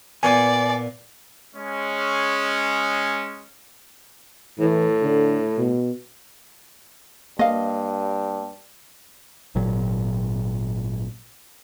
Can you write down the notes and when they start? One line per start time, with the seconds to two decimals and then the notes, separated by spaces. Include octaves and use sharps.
0.23 A#2 B3 D5 G#5
1.55 G#3 C#4
4.59 A2 E3
5.02 D3
5.58 B2
7.39 G2 A#3 D#5 F5
9.55 G#1 A#2 F#3